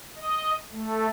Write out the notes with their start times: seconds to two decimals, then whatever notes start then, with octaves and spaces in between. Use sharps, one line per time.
0.16 D#5
0.71 A3